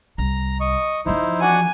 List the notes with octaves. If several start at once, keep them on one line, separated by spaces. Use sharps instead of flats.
C2 A#5
D#5 C#6
E3 F3 D#4 E4 C5
D4 F#4 F#5 G#5